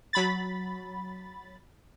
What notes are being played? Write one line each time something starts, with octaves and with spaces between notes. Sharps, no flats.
F#3 B5 A6